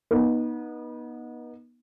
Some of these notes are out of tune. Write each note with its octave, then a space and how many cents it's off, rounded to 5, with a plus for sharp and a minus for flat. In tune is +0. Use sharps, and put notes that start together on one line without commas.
B3 -30 D#4 +0